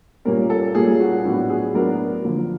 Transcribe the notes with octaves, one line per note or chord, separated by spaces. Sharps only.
A#2 G3 A#3 C#4 A#4
A4
A#2 G3 A#3 C#4 G#4
F#4
A2 F#3 B3 D4 F#4
G#4
A2 F#3 B3 D4 A#4
D3 F3 A#3